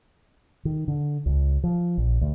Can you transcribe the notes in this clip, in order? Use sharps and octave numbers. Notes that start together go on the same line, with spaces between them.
D#3
D3
C#2
F3
A#1
D2